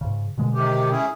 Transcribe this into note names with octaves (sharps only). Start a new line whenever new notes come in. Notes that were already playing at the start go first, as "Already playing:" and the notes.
G#2 C#3
B2 D3 G#3
C3 D#3 G4
C#4 E4 G#4